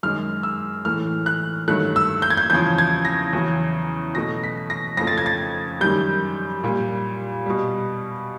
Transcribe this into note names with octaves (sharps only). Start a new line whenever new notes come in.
F#2 D#3 G#3 F6
E6
A2 E3 A3 F6
F#6
G2 D#3 F#3 A3 F#6
E6
G6
G#6
G6
E2 C#3 F3 G6
G#6
A#6
E2 C#3 F#3
B2 F#3 A3 A#6
B6
A#6
F2 C#3 F3 A3 A#6
A6
G#6
A6
F#2 D#3 G3 G6
A#2 G3
B2 G3